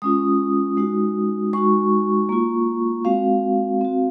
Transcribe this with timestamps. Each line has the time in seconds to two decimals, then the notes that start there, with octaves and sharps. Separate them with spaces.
0.02 G#3 C#4 F4 D#6
0.77 G#3 D#4 F#4
1.53 G#3 D#4 F#4 C#6
2.29 A#3 F4
3.05 G#3 C4 F#4 F5
3.81 C4 F#4